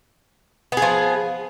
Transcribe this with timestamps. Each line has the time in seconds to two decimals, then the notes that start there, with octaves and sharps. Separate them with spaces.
0.72 B3
0.77 G#4
0.82 F3